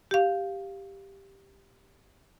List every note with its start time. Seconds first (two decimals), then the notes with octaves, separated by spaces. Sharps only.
0.11 G4 F5